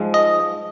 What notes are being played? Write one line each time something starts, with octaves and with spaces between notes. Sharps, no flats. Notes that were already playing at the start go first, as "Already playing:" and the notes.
Already playing: G#2 F3 G#3
D#5